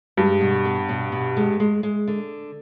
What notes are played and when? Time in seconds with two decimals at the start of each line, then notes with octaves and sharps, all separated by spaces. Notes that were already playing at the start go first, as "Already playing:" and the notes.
0.17 G2 G#3
0.41 B2
0.65 B3
0.89 B2
1.12 B2
1.37 G#3
1.60 G#3
1.83 G#3
2.07 D3